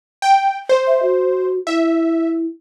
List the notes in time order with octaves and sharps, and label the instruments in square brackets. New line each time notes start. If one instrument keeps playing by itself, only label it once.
[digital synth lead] G5
C5
[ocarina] E5
F#4
[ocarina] E4 [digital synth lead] E5